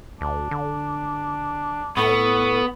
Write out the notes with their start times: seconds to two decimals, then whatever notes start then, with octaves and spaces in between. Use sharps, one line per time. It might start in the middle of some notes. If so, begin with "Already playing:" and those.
0.21 D2 D4
0.51 D3
1.97 A2 B3 A4 C#5